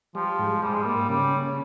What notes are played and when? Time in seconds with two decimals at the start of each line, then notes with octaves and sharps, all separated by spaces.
0.15 F3 G3
0.39 G#2
0.62 G#2 G3
0.72 G#3
0.82 G3 A#3
1.09 C#3 G3